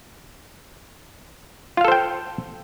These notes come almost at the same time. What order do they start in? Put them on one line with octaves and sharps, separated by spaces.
F4 F5 A4 C5 G5